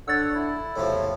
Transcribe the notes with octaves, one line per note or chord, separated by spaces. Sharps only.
D3 C#5 F#5 E6 A6
E4
E2 A2 C3 F3